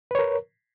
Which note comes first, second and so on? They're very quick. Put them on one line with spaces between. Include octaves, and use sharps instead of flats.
B4 C#5 A#4